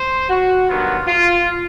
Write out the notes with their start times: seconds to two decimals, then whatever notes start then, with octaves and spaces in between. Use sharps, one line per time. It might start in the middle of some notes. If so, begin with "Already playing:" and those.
Already playing: C5
0.29 F#4
0.68 G2 D#3 F#3 B3 F4
1.07 F4